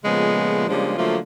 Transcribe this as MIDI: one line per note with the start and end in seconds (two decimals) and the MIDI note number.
0.04 0.67 46
0.04 0.67 49
0.04 0.67 53
0.04 0.67 56
0.04 0.67 57
0.04 0.67 59
0.69 0.95 49
0.69 0.95 53
0.69 0.95 55
0.69 0.95 56
0.69 0.95 58
0.69 0.95 62
0.98 1.18 50
0.98 1.18 53
0.98 1.18 54
0.98 1.18 57
0.98 1.18 58
0.98 1.18 65